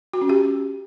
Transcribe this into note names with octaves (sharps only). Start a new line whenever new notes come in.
F#4
C#4
G4